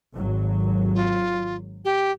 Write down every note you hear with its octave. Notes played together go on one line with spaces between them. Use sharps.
G#1 F#3
F4
G4